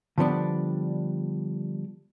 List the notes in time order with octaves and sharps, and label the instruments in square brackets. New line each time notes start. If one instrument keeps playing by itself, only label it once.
[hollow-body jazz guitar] D3 F3 G3 B3 D4